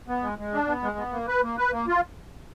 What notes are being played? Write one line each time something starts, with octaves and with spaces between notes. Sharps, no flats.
B3
G#3
G#3
D4
B3
G#3
B3
A#3
B4
A#3
B4
A#3
F4